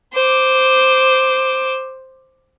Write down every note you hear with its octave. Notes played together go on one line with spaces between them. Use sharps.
C5 D6